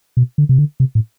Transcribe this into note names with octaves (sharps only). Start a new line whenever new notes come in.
B2
D3
C3
D3
C3
A2